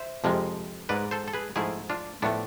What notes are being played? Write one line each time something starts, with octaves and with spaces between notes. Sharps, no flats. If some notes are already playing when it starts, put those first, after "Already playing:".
Already playing: C5 E5
F2 C3 F3 G#3
G#2 G#3 B4 D5
A4 C5
A4
G#4 B4
G#2 F3 A3 E4 G#4
D4 F4
A2 F3 A3 B3 D4